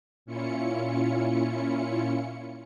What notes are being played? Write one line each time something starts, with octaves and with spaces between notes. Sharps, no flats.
A#2 C#4 E4 F4 C#7